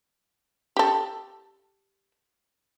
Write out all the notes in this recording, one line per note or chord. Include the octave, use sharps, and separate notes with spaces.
G4 A4